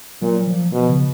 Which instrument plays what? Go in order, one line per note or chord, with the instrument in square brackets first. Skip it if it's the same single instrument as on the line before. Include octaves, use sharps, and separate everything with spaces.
[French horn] A#2 [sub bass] F#3
[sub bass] F3
[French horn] B2 [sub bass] F3
[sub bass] C#3